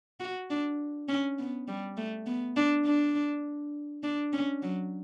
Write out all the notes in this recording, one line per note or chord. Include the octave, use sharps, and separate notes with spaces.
F#4
D4
C#4
B3
G3
A3
B3
D4
D4
D4
C#4
F#3